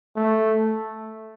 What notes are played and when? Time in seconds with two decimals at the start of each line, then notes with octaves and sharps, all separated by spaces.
0.16 A3